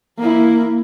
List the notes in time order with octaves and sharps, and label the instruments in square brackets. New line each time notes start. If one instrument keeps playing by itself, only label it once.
[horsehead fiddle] A#3 E4